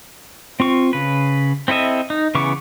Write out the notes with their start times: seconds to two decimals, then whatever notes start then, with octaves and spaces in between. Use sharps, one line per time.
0.60 C4 F4 C#6
0.93 C#3 B4
1.68 C4 E4 A4 D#5 E5
2.10 D#4
2.35 C#3 E3 B3 C#6 D6